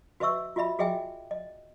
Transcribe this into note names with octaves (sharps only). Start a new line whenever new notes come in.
F#4 B4 D#5 E5 C#6 E6
F4 F#4 D#5 E5 B5
F#4 G#4 D#5 E5 G5 G#5
D#5